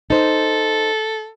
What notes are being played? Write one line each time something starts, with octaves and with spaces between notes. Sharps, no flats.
D#4 A4 C5